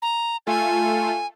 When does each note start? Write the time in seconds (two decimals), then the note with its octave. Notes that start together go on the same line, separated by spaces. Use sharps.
0.02 A#5
0.47 A3 F4 A4 G#5